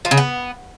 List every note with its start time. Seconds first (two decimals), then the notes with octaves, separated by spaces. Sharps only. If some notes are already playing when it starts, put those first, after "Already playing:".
0.05 F3
0.11 C#3
0.17 B3